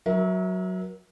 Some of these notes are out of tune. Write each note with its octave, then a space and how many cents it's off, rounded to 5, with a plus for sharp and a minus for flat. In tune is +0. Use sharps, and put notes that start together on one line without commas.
F#3 +0 A#4 +40 E5 -20